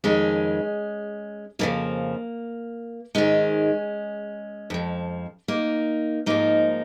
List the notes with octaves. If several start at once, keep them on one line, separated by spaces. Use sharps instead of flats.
F2 D#3 G#3 C#4
F2 C#3 F3 A#3
G#2 D#3 G#3 C#4
F2 F3
A#3 D#4
G#2 F3 A#3 D#4